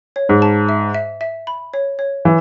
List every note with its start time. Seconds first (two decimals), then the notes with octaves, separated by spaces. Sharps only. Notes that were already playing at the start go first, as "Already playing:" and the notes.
0.16 C#5
0.29 G#2
0.42 A5
0.69 E5
0.95 E5
1.21 E5
1.47 B5
1.74 C#5
1.99 C#5
2.25 E3